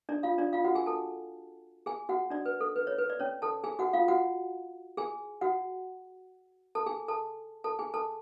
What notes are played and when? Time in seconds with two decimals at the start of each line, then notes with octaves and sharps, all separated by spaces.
0.09 D4 D5
0.23 F4 F5
0.38 D4 D5
0.53 F4 F5
0.64 F#4 F#5
0.75 G#4 G#5
0.86 A4 A5
1.86 G#4 G#5
2.09 F#4 F#5
2.30 D4 D5
2.46 B4
2.61 A4
2.76 B4
2.87 C#5
2.98 B4
3.10 D5
3.19 C#4 C#5
3.42 A4 A5
3.64 G#4 G#5
3.79 F#4 F#5
3.93 F4 F5
4.08 F#4 F#5
4.97 G#4 G#5
5.41 F#4 F#5
6.75 A4 A5
6.86 G#4 G#5
7.08 A4 A5
7.64 A4 A5
7.79 G#4 G#5
7.94 A4 A5